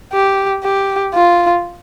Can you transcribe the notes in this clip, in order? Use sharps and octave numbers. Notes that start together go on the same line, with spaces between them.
G4
G4
F4